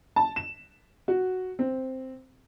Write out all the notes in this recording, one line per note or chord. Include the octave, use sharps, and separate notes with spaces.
A5
E7
F#4
C4